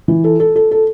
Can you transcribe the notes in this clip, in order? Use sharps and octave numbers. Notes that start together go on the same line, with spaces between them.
E3
A4
A4
A4
A4